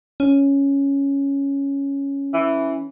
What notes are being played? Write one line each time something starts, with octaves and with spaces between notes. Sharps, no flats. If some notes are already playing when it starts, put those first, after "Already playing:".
C#4
E3